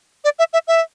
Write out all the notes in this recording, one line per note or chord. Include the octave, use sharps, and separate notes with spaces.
D5
E5
E5
E5